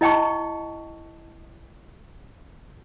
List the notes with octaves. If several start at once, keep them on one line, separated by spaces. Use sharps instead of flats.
E4 D#5 G5 A5 C#6